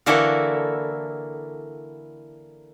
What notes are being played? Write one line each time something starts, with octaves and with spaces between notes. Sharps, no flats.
D3 E3 A#3 E4 F#4 A4